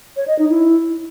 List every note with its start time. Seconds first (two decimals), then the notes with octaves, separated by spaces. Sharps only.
0.16 C#5
0.28 D#5
0.39 D#4
0.50 E4